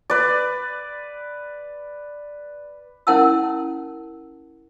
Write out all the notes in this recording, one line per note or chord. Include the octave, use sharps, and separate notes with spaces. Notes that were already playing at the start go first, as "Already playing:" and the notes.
B4 D5
C#4 E4 A#4 F#5 A5 E6